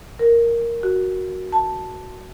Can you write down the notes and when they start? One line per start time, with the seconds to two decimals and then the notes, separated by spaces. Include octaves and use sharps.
0.19 A#4
0.83 F#4
1.52 A5